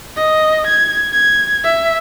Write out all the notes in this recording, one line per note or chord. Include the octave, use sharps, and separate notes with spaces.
D#5
G#6
G#6
E5